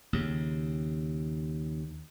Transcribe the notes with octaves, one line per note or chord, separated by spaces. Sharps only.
D#2 C#3